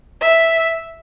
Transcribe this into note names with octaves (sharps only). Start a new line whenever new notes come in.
E5